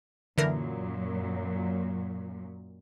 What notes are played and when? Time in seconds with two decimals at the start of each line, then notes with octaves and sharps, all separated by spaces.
0.38 F#2 A#2 D3 E3 F#3 A#4